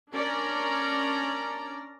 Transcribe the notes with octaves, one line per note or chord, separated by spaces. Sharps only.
C#4 D4 A#4 D5 A#5